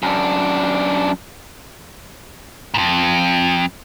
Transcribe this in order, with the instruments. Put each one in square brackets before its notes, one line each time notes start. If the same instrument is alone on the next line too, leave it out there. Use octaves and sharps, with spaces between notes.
[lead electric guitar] F#2 D4
F2 G#2